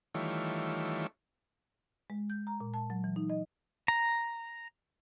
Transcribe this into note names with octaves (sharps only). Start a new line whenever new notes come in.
D#3 E3 G3 A3 F4 C#5
G#3
G6
A#5
A#2
A5
F#3
E3
D#4
D#5
A#5